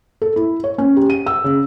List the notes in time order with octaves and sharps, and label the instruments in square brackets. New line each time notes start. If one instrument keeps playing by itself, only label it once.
[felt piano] A4
E4
C#5
C#4
G4
D#7
E6
C#3